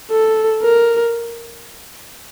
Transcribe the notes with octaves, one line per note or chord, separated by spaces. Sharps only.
A4
A#4